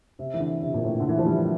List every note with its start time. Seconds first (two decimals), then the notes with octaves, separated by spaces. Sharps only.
0.19 C3
0.34 E3
0.40 D3
0.62 C3
0.74 A#2
0.83 A2
1.00 D3
1.09 E3
1.18 F3
1.26 G3